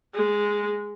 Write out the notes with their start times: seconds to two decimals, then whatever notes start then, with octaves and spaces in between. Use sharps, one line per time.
0.15 G#3